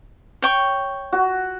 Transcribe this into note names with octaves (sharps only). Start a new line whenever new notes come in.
C#5 G5 C#6
F#4